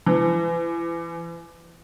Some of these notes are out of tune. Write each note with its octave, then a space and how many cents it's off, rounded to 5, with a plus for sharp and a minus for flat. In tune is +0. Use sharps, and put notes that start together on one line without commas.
E3 +35